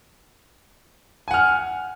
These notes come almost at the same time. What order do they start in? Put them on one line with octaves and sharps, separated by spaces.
G#5 F#5 F6